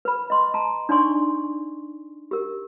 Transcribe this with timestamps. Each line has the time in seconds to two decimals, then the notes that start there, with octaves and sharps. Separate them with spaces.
0.05 B4 B5
0.30 D#5 C6
0.54 A5 A#5
0.89 D4 D#4 D5 G#5 C6 C#6
2.31 G4 A#4